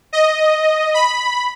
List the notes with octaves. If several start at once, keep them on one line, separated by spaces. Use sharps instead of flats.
D#5
B5